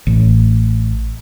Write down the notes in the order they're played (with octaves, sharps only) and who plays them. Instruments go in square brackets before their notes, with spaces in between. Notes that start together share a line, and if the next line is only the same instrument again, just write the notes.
[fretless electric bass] A1